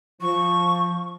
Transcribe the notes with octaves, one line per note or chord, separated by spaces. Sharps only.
F3 C#6